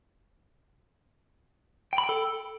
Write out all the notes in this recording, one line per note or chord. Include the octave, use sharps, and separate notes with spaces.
G5
B5
G5
A4